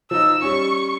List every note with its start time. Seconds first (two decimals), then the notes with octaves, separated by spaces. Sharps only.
0.11 F3 D#4 E6
0.42 G3 C#4 C#6